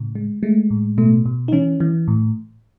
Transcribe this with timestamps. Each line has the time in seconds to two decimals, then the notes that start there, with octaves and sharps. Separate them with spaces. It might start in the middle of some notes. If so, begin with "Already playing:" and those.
Already playing: A2 C#3
0.15 G#3
0.43 G#3 A3
0.70 A2
0.98 B2 A3
1.26 B2
1.48 D#4
1.52 E3 C#4
1.80 E3
2.08 A2